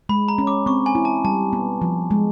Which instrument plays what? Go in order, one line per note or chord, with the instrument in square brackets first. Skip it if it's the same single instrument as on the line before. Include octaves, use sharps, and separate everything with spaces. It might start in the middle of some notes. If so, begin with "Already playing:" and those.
[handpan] G#3 [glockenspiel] B5
[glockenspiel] A#5
[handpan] C#4
[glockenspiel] D6
[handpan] C4 [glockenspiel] C#6
[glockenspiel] G#5
[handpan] E4
[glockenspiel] A5
[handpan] G3 [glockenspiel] A5
[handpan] B3
F3
G#3